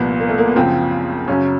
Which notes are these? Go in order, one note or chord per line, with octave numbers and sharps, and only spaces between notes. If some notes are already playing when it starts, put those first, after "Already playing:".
Already playing: C2 A#2 F3 B3
A#3
A3
A#3
B3
F#2 C#3 F3 C4
F#2 C#3 F#3 C#4